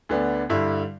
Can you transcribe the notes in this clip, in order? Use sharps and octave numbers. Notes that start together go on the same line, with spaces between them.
D2 D3 B3 D4
G2 D3 G3 E4